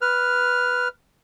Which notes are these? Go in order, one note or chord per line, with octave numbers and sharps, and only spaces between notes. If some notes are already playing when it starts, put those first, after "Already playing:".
B4 F6